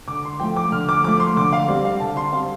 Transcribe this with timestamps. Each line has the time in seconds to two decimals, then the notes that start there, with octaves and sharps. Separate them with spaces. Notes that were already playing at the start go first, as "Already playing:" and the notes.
0.08 D3 D6
0.25 C6
0.40 F3 A3 G5
0.56 D6
0.72 D3 F6
0.89 D6
1.04 F3 A3 D6
1.20 C6
1.37 D3 D6
1.53 F5
1.68 G3 C4 D5
1.85 F5
2.00 D3 A5
2.17 C6
2.33 G3 C4 F5